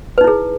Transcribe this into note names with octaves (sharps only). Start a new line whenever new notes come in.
D#4 E4 G#4 B4